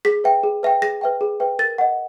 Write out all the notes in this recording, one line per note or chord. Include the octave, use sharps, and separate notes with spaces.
G#4 B6
B4 E5 G5
G#4
B4 E5 G5
G#4 A#6
B4 E5 G5
G#4
B4 E5 G5
A#4 A6
D#5 F#5